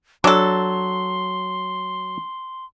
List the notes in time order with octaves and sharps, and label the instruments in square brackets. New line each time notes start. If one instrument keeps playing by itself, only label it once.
[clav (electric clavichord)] F#3 [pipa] D4 A4 [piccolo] C6